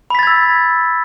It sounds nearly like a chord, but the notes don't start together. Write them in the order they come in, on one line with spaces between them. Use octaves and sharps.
B5 B6 A6 G#6 E6